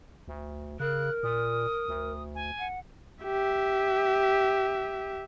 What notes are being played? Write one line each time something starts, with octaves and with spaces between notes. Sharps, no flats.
D2
C#3 A#4 F#6
A#2 D#6
D2
G#5
F#5
G4 E5